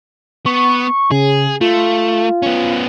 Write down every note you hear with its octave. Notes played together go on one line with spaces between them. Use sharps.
B3 C#6
C#3 G#4
A3 F4
B3 C#4